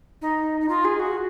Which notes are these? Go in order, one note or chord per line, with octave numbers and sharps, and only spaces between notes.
D#4
D#4
F4
G#4
F#4